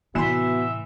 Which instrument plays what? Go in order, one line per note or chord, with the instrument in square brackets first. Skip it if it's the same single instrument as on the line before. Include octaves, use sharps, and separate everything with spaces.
[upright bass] A2 C3 [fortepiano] E3 C6 [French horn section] B3 F#4 [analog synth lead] E5